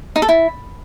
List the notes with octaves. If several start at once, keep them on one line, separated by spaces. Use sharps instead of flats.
D#4
A4
E4